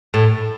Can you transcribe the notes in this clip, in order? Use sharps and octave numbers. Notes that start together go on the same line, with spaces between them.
A2